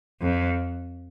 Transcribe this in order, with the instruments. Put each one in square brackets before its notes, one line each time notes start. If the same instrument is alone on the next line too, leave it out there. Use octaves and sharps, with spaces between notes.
[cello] F2